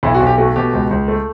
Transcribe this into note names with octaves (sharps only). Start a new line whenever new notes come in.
B1 E4
F#4
B1
G4
A3 F#4
B2 G4
C#2
C#2
A3